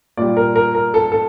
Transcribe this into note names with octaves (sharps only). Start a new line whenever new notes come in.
A#2 G3 D5
A#4
A#4
A#4
A4
A4